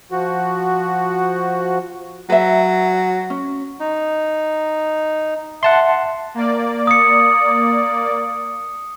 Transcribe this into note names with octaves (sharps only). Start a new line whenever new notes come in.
F3 F#4
F#3 B4 E5
C#4
D#4
E5 F#5 A5 C6
A#3 D5
D#6 C#7